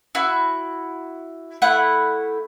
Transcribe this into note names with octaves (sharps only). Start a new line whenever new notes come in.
E4 F#4
A3 E4 F#5